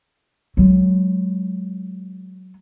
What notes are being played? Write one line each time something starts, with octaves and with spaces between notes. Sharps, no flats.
F#3 G#3